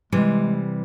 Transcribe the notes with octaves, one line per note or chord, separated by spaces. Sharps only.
C3 E3 G3 G#3